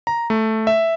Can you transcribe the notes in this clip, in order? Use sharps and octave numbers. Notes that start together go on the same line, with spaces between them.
A#5
A3
E5